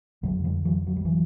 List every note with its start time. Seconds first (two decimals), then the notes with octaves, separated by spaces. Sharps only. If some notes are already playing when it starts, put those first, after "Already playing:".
0.23 F2 D3 F#3 G#3
0.44 F3 G3
0.65 E3 F#3
0.87 F#3
0.96 G3
1.05 E3 F#3